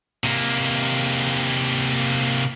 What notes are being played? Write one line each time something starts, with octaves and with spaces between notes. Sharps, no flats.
C3 A#3